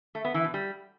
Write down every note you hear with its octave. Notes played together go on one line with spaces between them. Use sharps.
A3
B3
E3
B2
G3